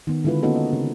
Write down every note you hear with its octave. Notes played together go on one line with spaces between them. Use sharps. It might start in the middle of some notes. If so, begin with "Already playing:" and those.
D#3 B3
D3 G#3 E4 F4 B4
A#3 B3 C#4 D#4 F#4 A4
D#5
C#3 C4